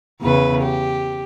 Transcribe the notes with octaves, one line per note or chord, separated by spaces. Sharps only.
E2 C#3 B4
G4